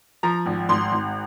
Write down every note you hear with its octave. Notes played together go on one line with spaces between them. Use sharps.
F3 A#5
G#1
G#1 C6
G#1